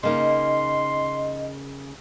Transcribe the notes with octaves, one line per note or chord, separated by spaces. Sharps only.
C#3 A#3 D#4 D#5 C6